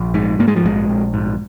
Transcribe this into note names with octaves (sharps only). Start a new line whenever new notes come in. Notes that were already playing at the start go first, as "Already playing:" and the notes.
Already playing: A#1
G#2
G#2 A#3
G#3
F3
A#1 G#3
A#1
G#2